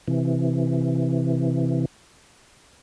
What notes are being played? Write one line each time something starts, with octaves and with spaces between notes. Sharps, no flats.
C3 E3